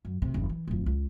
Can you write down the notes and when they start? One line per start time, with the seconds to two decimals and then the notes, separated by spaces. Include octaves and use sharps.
0.05 F#2
0.22 D2 C3
0.34 F#1 D#2
0.49 E3
0.68 D1 F2
0.86 C#2